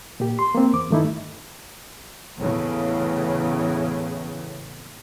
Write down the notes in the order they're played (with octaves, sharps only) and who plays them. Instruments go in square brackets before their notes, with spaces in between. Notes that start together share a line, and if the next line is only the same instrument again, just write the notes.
[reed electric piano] A#2 G4
C6
A#3 C4
E2 D6
G2 D#3 A3 D#4 E4
[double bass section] E2 A2 C#3